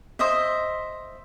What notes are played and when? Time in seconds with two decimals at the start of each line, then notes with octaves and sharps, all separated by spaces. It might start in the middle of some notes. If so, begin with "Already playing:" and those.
0.19 C5 D#5 E5